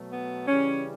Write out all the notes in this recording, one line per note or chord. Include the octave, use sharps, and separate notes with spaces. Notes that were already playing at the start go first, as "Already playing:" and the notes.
Already playing: B2 F#3 A3
B3
C#3 E3 G3 C#4